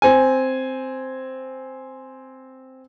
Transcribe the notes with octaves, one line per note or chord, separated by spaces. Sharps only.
C4 G#5